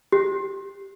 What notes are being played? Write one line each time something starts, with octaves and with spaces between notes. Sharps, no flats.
G4